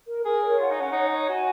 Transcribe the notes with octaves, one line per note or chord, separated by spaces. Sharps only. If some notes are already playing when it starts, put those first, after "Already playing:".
A#4
G#4 A#4
C#5
F4 F#5
D#4
C#4 F#5
D#4 C#5
C#5
F#4 G#5